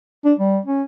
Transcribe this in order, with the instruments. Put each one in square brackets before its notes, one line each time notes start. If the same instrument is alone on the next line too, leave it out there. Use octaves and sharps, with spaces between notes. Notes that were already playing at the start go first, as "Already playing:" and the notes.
[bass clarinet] D4
G3
C#4